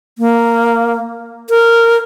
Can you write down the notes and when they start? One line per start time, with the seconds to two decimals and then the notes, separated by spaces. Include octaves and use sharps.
0.18 A#3
1.50 A#4